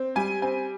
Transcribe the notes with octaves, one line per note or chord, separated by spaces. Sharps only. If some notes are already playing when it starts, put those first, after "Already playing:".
Already playing: C4
G3 G#5
C4 G#5